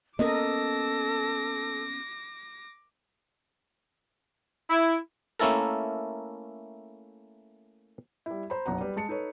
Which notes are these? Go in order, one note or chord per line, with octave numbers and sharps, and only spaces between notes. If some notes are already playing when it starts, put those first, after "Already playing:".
A#3 B3 C#4 A4 A#4 D#5 D6 A#6
E4
A3 A#3 C#4 E4 A4 A#4
G3 E4
C5 A#5 B5
F#1 B1 F#5 A#5
G3 B4
G#3 A5 C#7
D#4 A4 B4 C#5